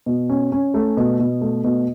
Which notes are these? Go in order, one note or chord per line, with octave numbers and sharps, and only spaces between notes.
B2
C#4
C#4
A3
B2
B2
A3
B2